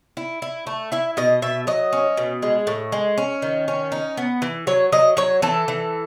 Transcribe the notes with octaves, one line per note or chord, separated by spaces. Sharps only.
E4
E4
A3
E4 E5
B2 D#5
B2 E5
F#3 D#5
C#4
B2
G#3
A2
G#3
C#4
D#3
C#4
D#4
B3
E3
F#3 C#5
F#3 D#5
F#3 C#5
E3 A4
E3